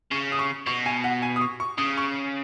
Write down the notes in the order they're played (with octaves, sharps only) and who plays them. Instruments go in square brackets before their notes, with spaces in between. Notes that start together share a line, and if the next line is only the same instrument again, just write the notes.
[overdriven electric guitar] C#3 [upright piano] C#6
[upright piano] D#6
C#6
[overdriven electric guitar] B2 [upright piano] C#6
[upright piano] G#5
F#5
G#5
D#6
C#6
C#6
[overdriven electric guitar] C#3 [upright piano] D#6
[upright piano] C#6